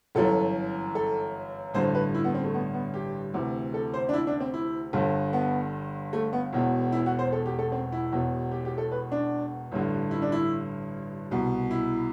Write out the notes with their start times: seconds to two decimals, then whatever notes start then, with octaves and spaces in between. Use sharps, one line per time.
0.15 G1 F#2 E3 A4
0.95 A4
1.74 A1 G2 D3 C5
1.95 B4
2.15 E4
2.24 B3
2.34 C4
2.44 A3
2.54 B3
2.74 B3
2.94 G4
3.34 D2 C3 E3
3.74 A4
3.94 C5
4.09 D4
4.14 E4
4.27 D4
4.40 C4
4.54 E4
4.93 G1 G2 D3
5.33 B3
6.13 A3
6.33 B3
6.53 E1 E2 B2
6.92 E4
7.06 F#4
7.19 C5
7.32 A4
7.46 G4
7.59 A4
7.72 C4
7.92 E4
8.12 E1 E2 B2
8.52 G4
8.65 G4
8.78 A4
8.92 B4
9.12 D4
9.72 A1 G2 D3
10.11 E4
10.22 D4
10.32 E4
11.31 C2 B2
11.71 E4